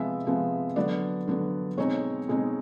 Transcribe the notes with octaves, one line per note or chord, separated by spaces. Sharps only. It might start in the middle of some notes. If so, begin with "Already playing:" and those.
Already playing: C3 F3 G#3 B3 E5
C3 F3 G#3 B3
D3 F#3 B3 D4 D5
D3 F#3 B3 D4
B2 G#3 C4 D#4 C#5
B2 G#3 C4 D#4